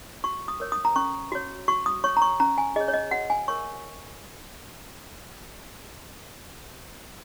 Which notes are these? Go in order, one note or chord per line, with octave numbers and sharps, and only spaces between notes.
F#4 C#6
D#6
A#4 C#5
D#6
A#5
C#4 C#6
F#4 C#5
F#4 C#6
D#6
C#5 C#6
A#5
C#6
C#4 A#5
G#5
G#4 C#5 D#5
C#5
D#5
F#4 F#5
G#5
A#4 C#5 C#6